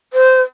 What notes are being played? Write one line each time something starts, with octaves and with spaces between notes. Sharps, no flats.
C5